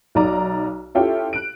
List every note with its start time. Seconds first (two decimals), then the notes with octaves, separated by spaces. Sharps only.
0.15 B1 D#4 D5 A#5
0.95 C#4 E4 F4 G4 A4 G5
1.33 F#6 D7